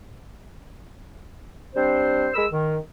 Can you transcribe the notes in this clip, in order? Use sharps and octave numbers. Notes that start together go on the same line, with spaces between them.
G3 C4 D4 C5
G#3 A#4 B5 E6
D#3